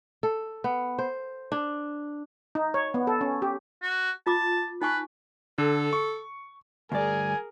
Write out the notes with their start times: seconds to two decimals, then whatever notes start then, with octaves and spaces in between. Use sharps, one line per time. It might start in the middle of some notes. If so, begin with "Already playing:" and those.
0.23 A4
0.64 B3
0.99 C5
1.52 D4
2.55 D#4
2.74 C#5
2.94 B3
3.07 A4
3.21 C#4
3.42 G4
3.82 F#4
4.27 F4 A5 D6
4.82 D#4 B4 G#5 C#6
5.58 D3 A4
5.93 C#6
6.92 D2 G2 G#4 A#4 D5 G#5